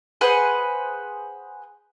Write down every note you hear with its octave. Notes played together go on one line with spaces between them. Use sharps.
G#4 B4 C5 F#5